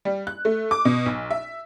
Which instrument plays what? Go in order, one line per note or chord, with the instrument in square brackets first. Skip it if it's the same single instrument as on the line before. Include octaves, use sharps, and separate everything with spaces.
[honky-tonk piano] G3
F#6
A3
D6
B2
B1
E5